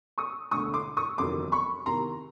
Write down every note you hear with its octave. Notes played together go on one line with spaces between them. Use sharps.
C#6 D#6
E1 D2 D3 C#6 D#6
C6 D6
C#6 D#6
G1 F2 C3 D#3 F#3 C6 D6
B5 C#6
E2 C3 D#3 A#5 C6